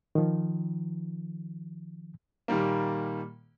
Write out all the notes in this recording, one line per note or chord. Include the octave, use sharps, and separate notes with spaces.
D#3 F3
A#2 D#3 G3 A#3